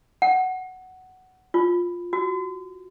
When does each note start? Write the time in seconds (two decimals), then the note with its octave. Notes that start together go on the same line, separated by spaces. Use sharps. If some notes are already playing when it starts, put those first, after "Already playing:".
0.22 F#5
1.54 F4
2.13 F#4